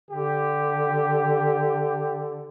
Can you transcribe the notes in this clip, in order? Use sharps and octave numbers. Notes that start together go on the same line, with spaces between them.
D3 G4